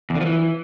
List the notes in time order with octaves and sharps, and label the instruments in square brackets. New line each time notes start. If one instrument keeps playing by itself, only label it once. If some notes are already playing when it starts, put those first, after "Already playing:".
[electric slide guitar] E2
D3
F3
E3